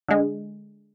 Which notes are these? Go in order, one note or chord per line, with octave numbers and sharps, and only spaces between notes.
D3 G#3